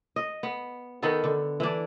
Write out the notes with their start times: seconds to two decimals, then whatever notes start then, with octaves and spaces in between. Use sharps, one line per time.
0.16 D#5
0.43 B3
1.02 D#3 B3 D#4 A4
1.24 D3
1.60 E3 D4